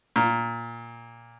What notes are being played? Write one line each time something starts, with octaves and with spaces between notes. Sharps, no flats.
A#2